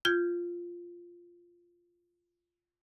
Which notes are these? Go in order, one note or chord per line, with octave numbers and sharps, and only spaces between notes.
F4 G6 G#6